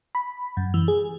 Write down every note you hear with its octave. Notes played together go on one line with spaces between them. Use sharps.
B5
F#2
E3
G#4